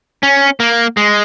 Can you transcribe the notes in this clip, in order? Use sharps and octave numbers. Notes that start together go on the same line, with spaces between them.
C#4
A#3
G#3